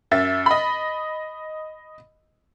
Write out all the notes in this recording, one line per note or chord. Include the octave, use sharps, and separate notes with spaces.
F#2 E5 A6
D#5 B5